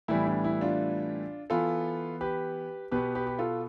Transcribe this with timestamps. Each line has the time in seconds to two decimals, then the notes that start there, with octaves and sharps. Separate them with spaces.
0.08 A2 E3 G3 B3 E4
0.26 D4
0.44 E4
0.61 D4 F4
1.50 E3 B3 F4 A4
2.21 G4 B4
2.92 B2 B3 G4 B4
3.15 G4 B4
3.27 G4
3.39 F4 A4